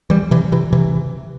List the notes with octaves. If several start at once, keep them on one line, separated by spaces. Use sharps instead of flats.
E3 G3
C3 E3
C3 E3
C3 E3